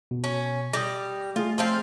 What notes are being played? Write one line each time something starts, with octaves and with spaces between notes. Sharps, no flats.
B2
C#4
G3 D#6 A#6
A3 F4 G#4
F3 C4 F5